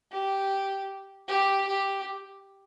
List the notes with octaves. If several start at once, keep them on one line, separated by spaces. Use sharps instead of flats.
G4
G4
G4